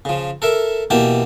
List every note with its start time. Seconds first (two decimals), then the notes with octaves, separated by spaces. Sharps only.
0.05 C#3 F3
0.42 A4 A#4 E5
0.90 B2 E3 A#3 G4 A5